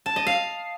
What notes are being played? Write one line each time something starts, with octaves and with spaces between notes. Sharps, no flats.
A5
D#5
F5